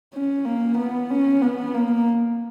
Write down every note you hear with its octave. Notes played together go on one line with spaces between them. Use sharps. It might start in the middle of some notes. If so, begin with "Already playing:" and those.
C#4
A#3
B3
C#4
B3
A#3